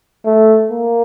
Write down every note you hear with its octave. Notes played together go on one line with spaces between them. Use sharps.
A3
A#3